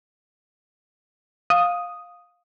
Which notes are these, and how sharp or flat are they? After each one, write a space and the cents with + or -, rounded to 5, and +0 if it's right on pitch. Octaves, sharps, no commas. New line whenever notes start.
F5 +15 D#6 +0